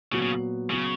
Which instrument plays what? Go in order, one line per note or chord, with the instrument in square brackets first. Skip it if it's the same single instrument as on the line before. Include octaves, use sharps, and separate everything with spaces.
[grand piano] A#2 F#3 B3 F#4 [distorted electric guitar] C#3
[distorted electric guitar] C#3
[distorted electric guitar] C#3 [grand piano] F#3 B3 F#4